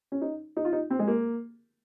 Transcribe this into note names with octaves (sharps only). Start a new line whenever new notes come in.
C#4
D#4
D#4
F4
D#4
C4
G#3
A#3